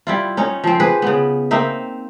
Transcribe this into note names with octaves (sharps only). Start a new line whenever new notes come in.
G3 E4 F4
C#4 D#4 C#5
F3 C4
G4 G#4 B4 C5
C#3 B3
A#3 C4 D#4 E5